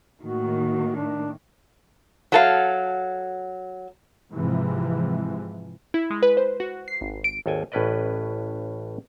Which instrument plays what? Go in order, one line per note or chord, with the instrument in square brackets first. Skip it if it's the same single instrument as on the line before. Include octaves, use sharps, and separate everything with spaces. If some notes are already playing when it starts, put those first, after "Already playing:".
[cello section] A2 D#3 A#3 [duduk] F#4
[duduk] D4
[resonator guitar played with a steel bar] F#3 A4 F5
[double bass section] G#2 C3 E3 F3
[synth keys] E4
G#3
B4
C5
F#4
C7
G#1
D7
[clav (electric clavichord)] G#1 D#2 A4 G5 G#5
A1 A2 C#4 B4 D5 D#5